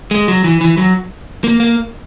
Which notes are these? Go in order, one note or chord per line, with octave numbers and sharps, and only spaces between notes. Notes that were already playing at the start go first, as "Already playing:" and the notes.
G#3
F#3
E3
E3
F#3
A#3
A#3